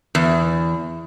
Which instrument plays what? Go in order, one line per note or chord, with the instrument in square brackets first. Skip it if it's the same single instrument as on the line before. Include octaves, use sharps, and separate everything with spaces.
[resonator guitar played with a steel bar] E2